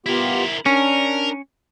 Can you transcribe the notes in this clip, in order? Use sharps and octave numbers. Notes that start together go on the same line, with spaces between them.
B3 E4 F4 G4 A#4
C#4 D4 A#4